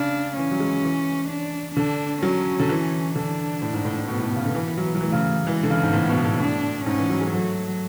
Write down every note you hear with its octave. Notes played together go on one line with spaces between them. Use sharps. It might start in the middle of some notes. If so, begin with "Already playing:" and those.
Already playing: C#3 D4
E3 C#4
F#3
G#3
E3
D4
D3 D4
F#3 C#4
D3
E3
D3 D4
A2
G#2
A2
B2 B3
A2
B2
C#3
D3
E3
E3
F#3
F#3
E3 A3
C#3
E3 G#3
D3
C#3
G#2
A2 B3
B2
A2
A2 D4
G#2 C#4
E3
F#3
G#3
F#3 A3